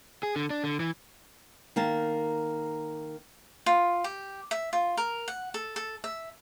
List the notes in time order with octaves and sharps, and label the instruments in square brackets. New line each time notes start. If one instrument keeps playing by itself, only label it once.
[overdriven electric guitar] G#4
D3
D4
D3
E3
[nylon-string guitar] D#3 A#3 A5
[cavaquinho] F4
G4
E5
F4
A#4
F#5
A4
A4
E5